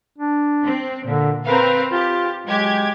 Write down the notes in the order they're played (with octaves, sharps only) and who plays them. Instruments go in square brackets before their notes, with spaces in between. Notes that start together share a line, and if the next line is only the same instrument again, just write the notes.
[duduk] D4
[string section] C4
[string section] A#2 [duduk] D3
[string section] C4 A#4 F5 [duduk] B4
[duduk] F4 [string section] G4
[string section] F#3 G4 G#6 [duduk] G#3